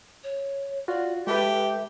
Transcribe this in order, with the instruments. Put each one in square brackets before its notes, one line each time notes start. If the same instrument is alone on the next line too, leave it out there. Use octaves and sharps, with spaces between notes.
[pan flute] C#5
[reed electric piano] F4 F#4 [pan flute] D5
[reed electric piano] G#3 A4 B4 [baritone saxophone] G4 [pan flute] E5